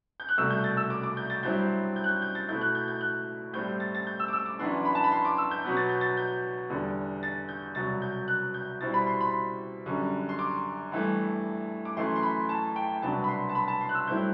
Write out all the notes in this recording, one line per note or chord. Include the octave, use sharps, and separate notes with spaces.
G6
F#6
C2 B2 A3 E6
G6
A6
E6
D6
D6
G6
A6
G2 F#3 C4 E4 G6
G6
F#6
G6
G6
A6
B2 A3 E4 G6
F#6
G6
G6
F#6
A2 G3 C4 G6
A6
A6
G6
E6
D6
E6
D6
F#2 E3 B3 D4 C6
B5
A5
B5
C6
D6
E6
G6
B2 F#3 B3
A6
G6
A6
G6
E2 D3 G3
A6
G6
C2 B2 F#3 A6
G6
F#6
G6
B2 G3 C4 E4 A6
B5
C6
B5
F#2 D3 G3
C6
D6
G2 E3 A3
D6
F#2 E3 A3 C6
C6
B5
A5
G5
C2 B2 F#3 B3 D4 A5
B5
C6
A5
B5
A5
C6
F#6
E6
G2 F#3 A3 C4 E4 G6